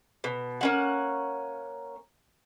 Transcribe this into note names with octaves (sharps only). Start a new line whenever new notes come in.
B2
A#3 C#4 F#5